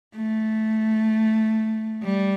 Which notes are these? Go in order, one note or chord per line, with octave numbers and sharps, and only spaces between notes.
A3
G3